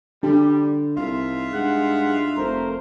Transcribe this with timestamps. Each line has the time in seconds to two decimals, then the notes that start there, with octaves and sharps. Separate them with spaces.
0.23 D3 G3 D4 G4
0.97 C2 D#4 F4 E5
1.53 G2 G#3 F#5
2.37 F1 A3 A#4 C5